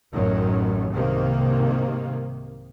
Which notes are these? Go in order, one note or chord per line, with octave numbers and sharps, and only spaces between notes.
A1 F#2 A2 D#3 F#3
C2 G#2 C3 D#3 A#3